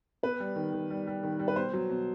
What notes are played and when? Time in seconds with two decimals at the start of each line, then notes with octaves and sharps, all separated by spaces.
0.23 B3 B4
0.40 G3
0.56 D#3
0.73 D#3
0.90 G3
1.07 G3
1.23 D#3
1.39 G3
1.48 B4
1.56 B2 C5
1.73 F#3
1.90 B2